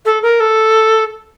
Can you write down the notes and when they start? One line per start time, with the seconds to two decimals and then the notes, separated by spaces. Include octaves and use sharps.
0.05 A4
0.22 A#4
0.40 A4